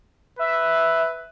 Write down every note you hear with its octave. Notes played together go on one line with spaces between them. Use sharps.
B4 E5